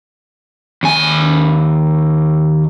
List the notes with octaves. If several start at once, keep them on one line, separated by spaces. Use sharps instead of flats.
D#2 G#5